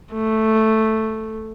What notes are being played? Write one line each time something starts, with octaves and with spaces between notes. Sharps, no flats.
A3